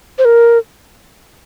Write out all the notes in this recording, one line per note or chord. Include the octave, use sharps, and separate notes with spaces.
C5
A#4